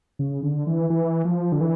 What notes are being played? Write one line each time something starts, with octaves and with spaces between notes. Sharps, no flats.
C#3
D3
E3
E3
F3
D3
E3